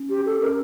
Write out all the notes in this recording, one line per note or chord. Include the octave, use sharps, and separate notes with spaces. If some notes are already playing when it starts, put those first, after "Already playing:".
Already playing: C#4
G4
A4
C4
C#4 A#4